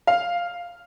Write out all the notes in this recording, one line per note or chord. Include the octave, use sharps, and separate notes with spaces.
F5